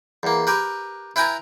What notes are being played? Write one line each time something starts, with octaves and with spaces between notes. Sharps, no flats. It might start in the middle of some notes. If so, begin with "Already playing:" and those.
E2 A#3
G4 A#4 B4
E4 B4 G5 G#5 A#5